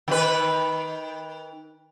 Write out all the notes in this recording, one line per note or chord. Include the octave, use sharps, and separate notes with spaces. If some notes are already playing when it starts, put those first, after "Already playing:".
D#3 B4